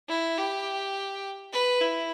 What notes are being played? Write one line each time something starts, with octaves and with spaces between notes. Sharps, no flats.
E4
G4
B4
E4